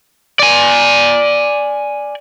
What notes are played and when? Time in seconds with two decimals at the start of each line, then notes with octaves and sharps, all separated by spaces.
0.39 D5 G#5